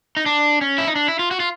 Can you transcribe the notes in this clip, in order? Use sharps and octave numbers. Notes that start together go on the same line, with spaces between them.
D#4
D4
C#4
E4
D#4
D4
E4
F4
F#4
F4